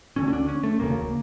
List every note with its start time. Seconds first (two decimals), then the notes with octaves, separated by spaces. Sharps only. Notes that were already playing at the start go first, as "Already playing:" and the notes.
0.16 D2 D3 C#4
0.28 C#4
0.33 D4
0.48 C#4
0.63 A3
0.79 E1 D2 C#3 A#3